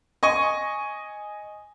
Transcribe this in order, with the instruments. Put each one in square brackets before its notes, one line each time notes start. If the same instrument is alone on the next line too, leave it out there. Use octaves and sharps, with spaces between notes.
[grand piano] D#5 G#5 C#6